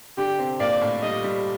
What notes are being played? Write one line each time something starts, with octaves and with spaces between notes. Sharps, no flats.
D3 D4 G4
C3 C4
A#2 A#3 D5
A2 A3
G3 D#5
G3